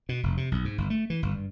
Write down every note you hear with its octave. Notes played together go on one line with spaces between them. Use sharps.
B2
F1
C3
B1
G#2
G1
A3
E3
G1
G2